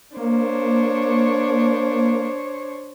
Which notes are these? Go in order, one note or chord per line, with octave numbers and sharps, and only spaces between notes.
A#3 D4 C5 C#5